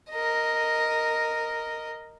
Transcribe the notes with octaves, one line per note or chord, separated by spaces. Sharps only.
A#4 D#5